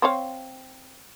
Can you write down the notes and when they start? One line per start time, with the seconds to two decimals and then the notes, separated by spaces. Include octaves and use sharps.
0.02 C4 C#5 F5